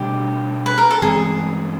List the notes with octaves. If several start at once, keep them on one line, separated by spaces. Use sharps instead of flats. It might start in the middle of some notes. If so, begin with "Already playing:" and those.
Already playing: B2 G3 D4 G4
B4
A#4
A4
G2 E3 G#3 C4 G#4